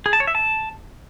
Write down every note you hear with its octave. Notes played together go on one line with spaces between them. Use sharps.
G#4
A5
C#5
E5
A5